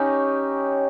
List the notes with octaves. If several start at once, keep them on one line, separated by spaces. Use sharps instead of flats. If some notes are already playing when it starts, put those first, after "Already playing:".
Already playing: C#4 D#4 G4